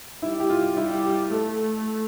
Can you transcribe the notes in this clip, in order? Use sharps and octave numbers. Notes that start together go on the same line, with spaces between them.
G3 E4
G4
F4
G3 E4
G4
A3 A4